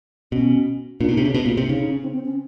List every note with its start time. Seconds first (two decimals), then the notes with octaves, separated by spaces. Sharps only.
0.32 B2 C#4
1.00 A#2 D4
1.09 B2 D#4
1.17 C3
1.20 D4
1.25 C#3
1.34 B2
1.46 A#2
1.57 C3
1.68 C#3 D#4
1.80 D#4
1.91 C#4
2.03 C4
2.14 C4
2.25 C#4